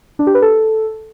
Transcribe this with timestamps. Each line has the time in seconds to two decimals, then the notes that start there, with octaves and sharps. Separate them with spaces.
0.19 D4
0.27 G4
0.34 B4
0.42 A4